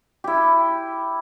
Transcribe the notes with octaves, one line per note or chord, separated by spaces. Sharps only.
E4 G4